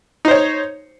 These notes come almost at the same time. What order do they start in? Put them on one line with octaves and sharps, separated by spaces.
D#4 C5 C#5